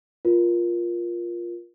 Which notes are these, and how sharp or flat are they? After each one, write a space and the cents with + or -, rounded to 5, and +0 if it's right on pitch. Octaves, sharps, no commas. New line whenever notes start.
F4 +0 A#4 +25